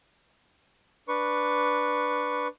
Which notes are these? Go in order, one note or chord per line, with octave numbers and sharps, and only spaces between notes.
D4 B4 C#6